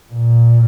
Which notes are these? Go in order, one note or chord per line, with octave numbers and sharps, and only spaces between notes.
A#2